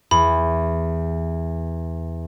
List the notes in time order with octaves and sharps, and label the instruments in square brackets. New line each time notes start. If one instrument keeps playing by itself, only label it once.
[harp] E2 [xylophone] B5